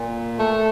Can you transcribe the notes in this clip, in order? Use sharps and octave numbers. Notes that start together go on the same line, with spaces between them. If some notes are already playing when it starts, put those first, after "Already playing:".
Already playing: A#2
A3